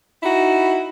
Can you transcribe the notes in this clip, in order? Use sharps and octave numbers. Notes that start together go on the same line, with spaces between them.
D#4 E4 F#4